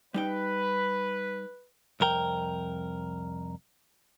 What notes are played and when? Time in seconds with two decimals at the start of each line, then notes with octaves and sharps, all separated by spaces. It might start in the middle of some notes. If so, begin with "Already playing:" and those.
0.14 G3 D#4 B4 G5
2.00 C2 F2 A#4 G5